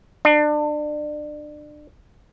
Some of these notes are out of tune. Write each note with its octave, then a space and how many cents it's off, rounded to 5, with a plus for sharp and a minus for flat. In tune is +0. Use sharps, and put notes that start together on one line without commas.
D4 +30